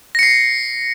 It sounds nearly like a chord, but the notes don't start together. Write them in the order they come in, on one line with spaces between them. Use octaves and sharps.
A#6 C#7 C7